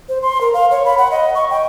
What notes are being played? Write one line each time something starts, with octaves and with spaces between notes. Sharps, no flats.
C5
C6
A#4
F5
C#5
B5
F#5
D#5
C#6
G5